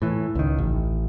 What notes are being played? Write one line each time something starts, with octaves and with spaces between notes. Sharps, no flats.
A2 E3
C#2 D#3
A1